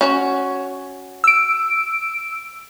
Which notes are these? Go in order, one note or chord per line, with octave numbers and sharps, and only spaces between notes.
C#4 F#4 C#5
E6 D7